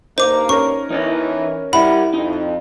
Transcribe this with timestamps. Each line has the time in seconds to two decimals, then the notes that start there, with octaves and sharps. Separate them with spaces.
0.18 G2 A#3 D#4 C5 D6
0.49 C#4 A#4 C#6
0.90 E3 D#4 C#5 D#5
1.73 G3 E4 A#4 E5 F#5 B5
2.14 F2 D#4